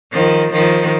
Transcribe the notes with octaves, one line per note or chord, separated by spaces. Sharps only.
D#3 F3
D#3 F3